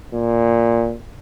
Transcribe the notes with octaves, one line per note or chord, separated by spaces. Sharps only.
A#2